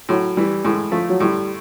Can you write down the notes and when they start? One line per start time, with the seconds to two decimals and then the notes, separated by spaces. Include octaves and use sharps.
0.09 A2 F#3
0.37 E3 G3
0.64 A2 G#3
0.92 F3 A3
1.09 F#3
1.20 A2 G3